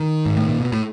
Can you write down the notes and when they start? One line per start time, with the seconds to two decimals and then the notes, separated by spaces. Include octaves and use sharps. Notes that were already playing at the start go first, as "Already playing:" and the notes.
Already playing: D#3
0.26 G#2
0.37 A2
0.49 A#2
0.60 B2
0.72 A2